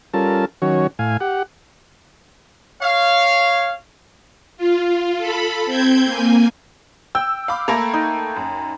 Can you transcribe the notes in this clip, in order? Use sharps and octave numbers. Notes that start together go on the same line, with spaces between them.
G3 C#4 F4 A4 A#4 A5
D#3 F#3 C#4 F#4 C#5
A2 F5 G#5
G4 F#5
C#5 F5
F4
A4 B5
C4 G6 G#6
A#3 G#5
G5 E6
F5 B5 D6
A3 A#3 A4 A#5 B5
D#4
F#2